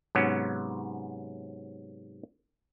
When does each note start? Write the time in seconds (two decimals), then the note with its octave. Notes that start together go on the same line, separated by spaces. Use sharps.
0.15 G#2 C3 F#3 B3 C#4